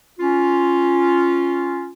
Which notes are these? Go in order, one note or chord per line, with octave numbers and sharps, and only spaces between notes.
C#4 F4